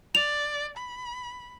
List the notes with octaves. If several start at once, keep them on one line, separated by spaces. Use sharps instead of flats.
D5 F7
B5